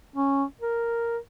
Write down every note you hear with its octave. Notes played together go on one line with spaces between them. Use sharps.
C#4
A#4